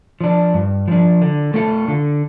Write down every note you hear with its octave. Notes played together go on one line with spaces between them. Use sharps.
F3 D4
G2
F3 D4
D3
A3 F4 A4
D3